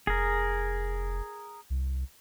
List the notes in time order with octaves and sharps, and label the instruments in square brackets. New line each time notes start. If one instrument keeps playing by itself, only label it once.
[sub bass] F1 [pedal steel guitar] G#4 A#4
[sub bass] C2